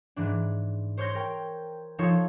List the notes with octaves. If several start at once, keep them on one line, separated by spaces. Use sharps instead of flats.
G#2 E3 D4
C5 C#5 C#6 G6 A#6
A#4 G5
F3 D#4 F4 A4 C#5